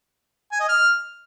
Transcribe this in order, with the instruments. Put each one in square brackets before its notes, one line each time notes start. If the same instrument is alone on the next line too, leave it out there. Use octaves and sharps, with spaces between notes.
[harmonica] G#5
D#5
F6